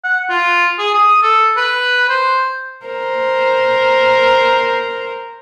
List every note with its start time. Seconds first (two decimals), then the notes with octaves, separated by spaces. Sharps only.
0.04 F#5
0.29 F4
0.79 G#4
0.95 D#6
1.23 A4
1.57 B4
2.09 C5
2.86 A#4 C5